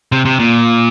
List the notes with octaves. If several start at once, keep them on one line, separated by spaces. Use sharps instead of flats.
C3
C3
A#2